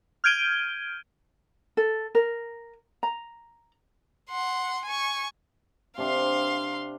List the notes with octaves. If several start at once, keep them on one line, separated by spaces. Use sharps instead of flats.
F6 G6 G#6 D7 D#7 G7
A4
A#4
A#5
F#5 C6
G#5 C#6
C3 D4 F5 C6